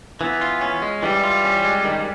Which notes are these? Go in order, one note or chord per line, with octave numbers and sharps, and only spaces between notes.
E3 B3
F4
C#4
G#3
E3 G3
F4
C#4
G#3
D#3